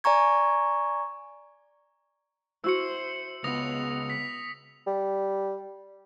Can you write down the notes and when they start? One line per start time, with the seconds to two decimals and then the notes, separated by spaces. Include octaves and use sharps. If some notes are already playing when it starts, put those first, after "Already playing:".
0.04 D5 G#5 A#5 C#6 G#6
2.64 E4 F#4 C5 E6 C#7
3.44 C#2 B3 D#6 A#6 F7
4.10 B6
4.87 G3